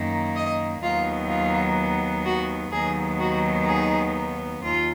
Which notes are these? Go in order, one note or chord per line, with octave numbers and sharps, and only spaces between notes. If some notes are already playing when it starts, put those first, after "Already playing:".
Already playing: F#2 D#3 A#3
D#5
D#2 D#3 F#3 B3 F4
F4
F#4
D#2 D#3 F#3 B3 G#4
F#4
G#4
D#2 F4